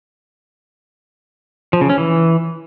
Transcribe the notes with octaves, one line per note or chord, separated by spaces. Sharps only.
F3
C#3
C#4
E3